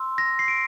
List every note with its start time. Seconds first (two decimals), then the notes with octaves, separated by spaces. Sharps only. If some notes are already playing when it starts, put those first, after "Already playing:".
Already playing: C6 E6
0.18 A#6
0.39 C7
0.48 D7